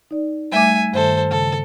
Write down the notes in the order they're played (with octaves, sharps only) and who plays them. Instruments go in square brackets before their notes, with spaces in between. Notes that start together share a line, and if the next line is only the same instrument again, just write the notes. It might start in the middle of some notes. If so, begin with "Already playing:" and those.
[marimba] D#4 D5
[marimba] G3 A3 D6 [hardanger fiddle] E5 G#5
[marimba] G2 D#3 [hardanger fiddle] A4 C5
[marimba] C#3 [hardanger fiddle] A4